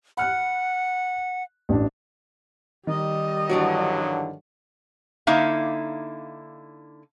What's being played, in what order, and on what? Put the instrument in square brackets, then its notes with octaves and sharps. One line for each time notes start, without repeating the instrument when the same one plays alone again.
[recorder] F#5 [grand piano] B5 F6 F#6
[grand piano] A1 A2 D4
[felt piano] D#3 [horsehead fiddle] G3 D#5
[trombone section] G2 D3 F#3 [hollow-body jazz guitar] E3 D4 F#4
[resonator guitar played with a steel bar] D3 A#3 D#4 E4 E5 F5